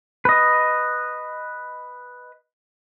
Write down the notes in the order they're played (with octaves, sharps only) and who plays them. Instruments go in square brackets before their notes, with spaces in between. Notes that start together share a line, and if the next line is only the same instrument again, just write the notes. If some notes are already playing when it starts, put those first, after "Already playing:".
[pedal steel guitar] B4 D#5